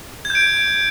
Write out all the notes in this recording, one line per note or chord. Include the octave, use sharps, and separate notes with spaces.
G#6
G6
D7